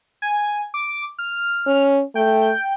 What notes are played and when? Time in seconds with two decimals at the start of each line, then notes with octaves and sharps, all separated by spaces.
0.22 G#5
0.74 D6
1.19 F6
1.67 C#4
2.15 A3 G5